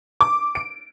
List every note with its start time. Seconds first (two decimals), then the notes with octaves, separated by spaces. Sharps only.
0.21 D6
0.55 D7